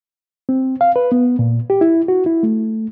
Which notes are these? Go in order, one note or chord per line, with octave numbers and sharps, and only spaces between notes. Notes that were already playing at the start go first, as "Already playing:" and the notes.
C4
F5
B4
B3
A#2
G4
E4
F#4
E4
A3